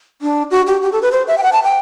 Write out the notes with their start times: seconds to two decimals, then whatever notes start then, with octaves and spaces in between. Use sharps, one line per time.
0.22 D4
0.51 F#4
0.67 G4
0.82 G4
0.92 A4
1.02 B4
1.12 C5
1.27 E5
1.38 G5
1.43 F#5
1.53 A5
1.63 G5